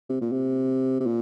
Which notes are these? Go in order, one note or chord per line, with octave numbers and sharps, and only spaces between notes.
C3
A#2
C3
C3
A#2